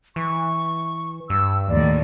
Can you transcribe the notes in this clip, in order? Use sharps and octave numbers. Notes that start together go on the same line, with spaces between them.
E3 C#6
G2 E6
D#2 A2 D5